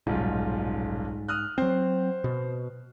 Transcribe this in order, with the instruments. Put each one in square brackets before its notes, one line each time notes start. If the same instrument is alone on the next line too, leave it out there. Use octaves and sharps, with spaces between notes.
[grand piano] D#1 B1 F4 [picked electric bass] G#2
[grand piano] D#6 F6 F#6
[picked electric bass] F#3 C4 [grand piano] C5
[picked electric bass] B2